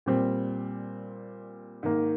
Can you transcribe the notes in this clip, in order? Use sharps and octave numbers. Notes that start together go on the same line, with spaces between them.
A#2 G3 C4
G#2 D#3 A#3